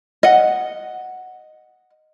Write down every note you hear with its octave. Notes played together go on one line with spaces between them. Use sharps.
D#5 F#5